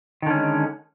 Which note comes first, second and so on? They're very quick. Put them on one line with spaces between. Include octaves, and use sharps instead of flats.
D#3 D3 C#4 G#3